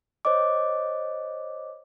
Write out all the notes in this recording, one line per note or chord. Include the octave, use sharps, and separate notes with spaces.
C5 C#5 D#5 D6